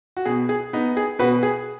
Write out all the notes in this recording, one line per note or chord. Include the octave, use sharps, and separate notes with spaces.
F#4
B2 G#4
G#4
B3 D#4
G#4
B2 F#4 B4
G#4